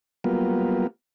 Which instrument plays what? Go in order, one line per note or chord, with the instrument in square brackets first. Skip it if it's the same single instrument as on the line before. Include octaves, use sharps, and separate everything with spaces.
[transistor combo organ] F#3 G3 A#3 B3 F4